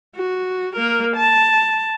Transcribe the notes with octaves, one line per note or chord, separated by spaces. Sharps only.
F#4
A#3 A#4
A5